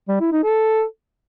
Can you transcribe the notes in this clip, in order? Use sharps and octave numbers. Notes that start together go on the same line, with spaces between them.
G3
E4
D#4
A4